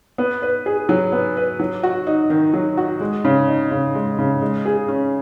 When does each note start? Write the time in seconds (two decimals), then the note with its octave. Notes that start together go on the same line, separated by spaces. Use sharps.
0.18 B3
0.42 B4
0.66 G#4
0.89 F#3
1.12 B3
1.37 B4
1.60 F#3
1.83 F#4
2.07 D#4
2.30 D#3
2.54 F#3
2.77 F#4
3.00 G#3
3.25 C#3
3.48 D#4
3.71 C#3
3.95 G#3
4.18 C#3
4.42 G#3
4.66 G#4
4.88 C#4